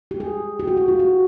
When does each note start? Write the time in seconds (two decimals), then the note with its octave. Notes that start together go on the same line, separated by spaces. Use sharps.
0.11 G4
0.20 G#4
0.59 G4
0.67 F#4
0.77 G4
0.88 F4
0.99 F#4